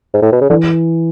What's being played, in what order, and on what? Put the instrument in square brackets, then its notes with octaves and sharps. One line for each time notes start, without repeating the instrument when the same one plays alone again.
[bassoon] G#2
A2
B2
C#3
[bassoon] D3 [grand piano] E3